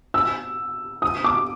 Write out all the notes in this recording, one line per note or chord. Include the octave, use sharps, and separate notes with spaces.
E6
D#6
D6